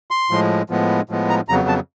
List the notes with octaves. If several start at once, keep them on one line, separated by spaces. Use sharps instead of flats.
C6
A2 F3 G#3
A2 F3 G#3 B3
A2 F3 G#3 B3
A#5
F2 C#3 F#3 B3 A#5
A5